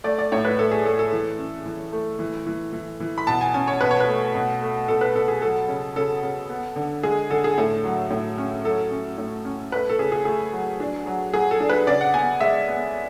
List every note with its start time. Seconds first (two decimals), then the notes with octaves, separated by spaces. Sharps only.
0.04 A3 D5
0.18 D5
0.32 A2 C#5
0.45 B4
0.58 A2 A4
0.71 G#4
0.85 A3 A4
0.99 A4
1.12 E3
1.38 C#4
1.66 E3
1.92 A3
2.19 E3
2.46 E3
2.73 E3
3.00 E3
3.18 B5
3.27 B2 A5
3.41 G#5
3.54 C#4 G#5
3.68 C#5
3.81 B2 B4
3.91 C#5
4.00 B4
4.08 A3
4.35 B2
4.62 A3
4.88 B2 A4
5.01 B4
5.15 B2 A4
5.28 G#4
5.42 F#3 A4
5.68 C#3
5.96 C#3 A4
6.23 C#3
6.50 B3
6.76 D3
7.03 G#3 G#4
7.30 D3 A4
7.44 G#4
7.58 A2 A4
7.84 F#3
8.10 A2
8.38 C#4
8.64 F#3 A4
8.91 C#4
9.18 A2
9.45 C#4
9.72 A3 B4
9.90 A4
9.99 C#3 G#4
10.12 G#4
10.25 A3 G#4
10.53 F#3
10.80 D4
11.06 F#3
11.33 F#3 G#4
11.51 A4
11.60 D4
11.69 B4
11.87 C#3 D5
12.01 F#5
12.14 B3 G#5
12.40 G#3 E5
12.68 B3